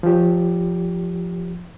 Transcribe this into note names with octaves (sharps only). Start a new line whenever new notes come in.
F3 G4